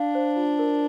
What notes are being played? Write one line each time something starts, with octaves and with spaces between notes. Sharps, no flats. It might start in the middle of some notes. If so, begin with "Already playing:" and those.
Already playing: D4 F5
C5
F4
A#4